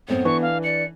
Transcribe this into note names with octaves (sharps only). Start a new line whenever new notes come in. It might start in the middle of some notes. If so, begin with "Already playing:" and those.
F#2 A2 B3 C4
E3 D4 C#6
F5
D5 C#7